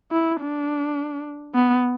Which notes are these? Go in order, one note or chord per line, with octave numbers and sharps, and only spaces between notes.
E4
D4
B3